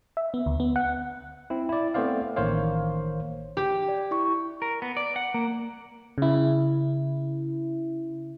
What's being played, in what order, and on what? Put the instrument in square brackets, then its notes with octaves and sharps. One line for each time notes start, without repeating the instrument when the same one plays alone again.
[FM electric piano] E5
B3
D2
B3
F#5
[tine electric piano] C4 E4
E4 D5
A3 B3 C4 C5 D5 F5
A1 D#3 A#3 C5 C#5 F5
[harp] G4
[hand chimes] D5
E4 C#6
[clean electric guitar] A#4
B3
D5
F#5
A#3
[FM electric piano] C#3 E4